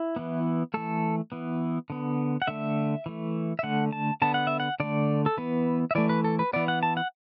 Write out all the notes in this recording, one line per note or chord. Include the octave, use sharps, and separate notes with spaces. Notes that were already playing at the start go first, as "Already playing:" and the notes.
Already playing: E4
E3 B3
E3 A3 A4
E3 B3
D3 B3
F#5
D3 A3 E5
E3 A3
E5
D3 A3 F#5
A5
D3 B3 A5
F#5
E5
F#5
D3 A3 D5
A4
E3 B3 B4
E5
E3 A3 D5
B4
A4
B4
E3 B3 D5
F#5
A5
F#5